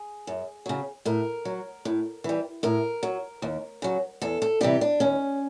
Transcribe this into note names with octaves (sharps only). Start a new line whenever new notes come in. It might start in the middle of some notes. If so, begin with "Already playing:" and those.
Already playing: G#4
F#2
C#3 F#3
A2 A#4
F#3
A2
E3 G3
A2 A#4
F#3
D#2
C#3 F#3
E2 A4
A4
C3 E3 G3 G4
D4
D#2 C#4